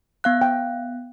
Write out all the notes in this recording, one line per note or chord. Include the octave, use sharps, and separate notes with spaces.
B3 F5 F#6
G5